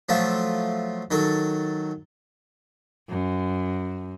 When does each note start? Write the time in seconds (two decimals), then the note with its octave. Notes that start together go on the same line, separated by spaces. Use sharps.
0.09 F3 F#3 A3 F4 E5
1.11 D#3 F#3 A4
3.09 F#2